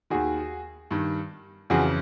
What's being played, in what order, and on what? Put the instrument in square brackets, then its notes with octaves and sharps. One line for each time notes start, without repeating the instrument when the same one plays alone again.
[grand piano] D#2 D#3 F#4 G#4
G2 D#3
F2 C#3 E3 F#4 G#4